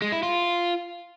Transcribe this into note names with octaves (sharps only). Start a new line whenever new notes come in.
G#3
E4
F4